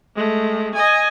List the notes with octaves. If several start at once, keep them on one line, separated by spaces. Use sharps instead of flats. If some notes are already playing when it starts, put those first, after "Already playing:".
G#3 A3
D#5 G#5